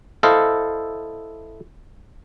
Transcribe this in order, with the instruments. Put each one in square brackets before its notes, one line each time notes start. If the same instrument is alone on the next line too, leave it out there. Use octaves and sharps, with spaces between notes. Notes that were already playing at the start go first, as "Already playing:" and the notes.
[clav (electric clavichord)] E4 A4 C5 D#5 F5